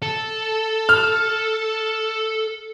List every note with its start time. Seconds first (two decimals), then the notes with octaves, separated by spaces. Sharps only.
0.02 A4
0.89 F6